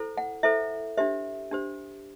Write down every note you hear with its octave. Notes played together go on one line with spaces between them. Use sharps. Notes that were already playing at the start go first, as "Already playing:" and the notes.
Already playing: E4 A4 C5
F#5
E4 A4 C5 E5
D4 G4 C5 E5
D4 G4 C5